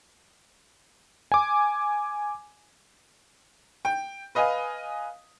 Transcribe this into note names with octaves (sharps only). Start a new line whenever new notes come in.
G#5 D6
G5
B4 D#5 F5 G#5